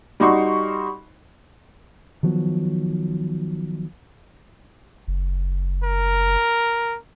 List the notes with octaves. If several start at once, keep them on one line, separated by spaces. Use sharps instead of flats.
G3 D#4 F#4 C6 C#6
D#3 F3 F#3 B3
F#1
A#4